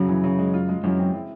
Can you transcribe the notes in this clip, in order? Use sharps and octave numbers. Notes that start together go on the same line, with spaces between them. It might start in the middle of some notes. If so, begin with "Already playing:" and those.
Already playing: F#2 C#3 F#3
E3
C#3
G#3
F4
G#3
F#2 E3
C4
E4